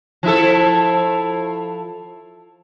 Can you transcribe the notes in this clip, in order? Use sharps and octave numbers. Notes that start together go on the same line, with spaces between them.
F3 E4 A4